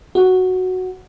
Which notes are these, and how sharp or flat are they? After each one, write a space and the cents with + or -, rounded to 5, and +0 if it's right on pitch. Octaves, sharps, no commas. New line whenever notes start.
F#4 +0